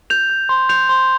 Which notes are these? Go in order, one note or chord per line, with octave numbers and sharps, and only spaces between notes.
G6 F7
G6
C6
G6 F7
C6